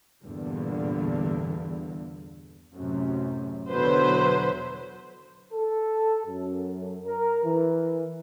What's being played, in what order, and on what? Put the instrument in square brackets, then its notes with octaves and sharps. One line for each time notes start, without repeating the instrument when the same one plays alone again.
[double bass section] E2 G2 A#2 D3
F#2 A2 C3
[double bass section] E2 B2 D3 [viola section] F#3 B4 C5
[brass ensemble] A4
F#2
A#4
E3